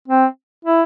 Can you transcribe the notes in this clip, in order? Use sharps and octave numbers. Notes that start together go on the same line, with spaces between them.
C4
E4